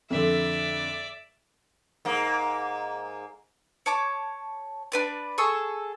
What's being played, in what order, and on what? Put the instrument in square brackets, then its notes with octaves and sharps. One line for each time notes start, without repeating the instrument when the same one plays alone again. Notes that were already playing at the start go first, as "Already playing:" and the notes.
[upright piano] F2 D3 [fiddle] D5 E5
[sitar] G#2 A#3
[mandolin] C#5 A5 D6
D4 B4 D5
G#4 A4 C#6 E6